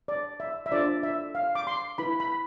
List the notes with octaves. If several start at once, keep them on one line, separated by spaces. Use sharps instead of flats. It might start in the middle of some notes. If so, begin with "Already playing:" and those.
D5
E5
E5
D4 F4 A4 C5 D5
E5
F5
D6
C6
E4 B4 B5
B5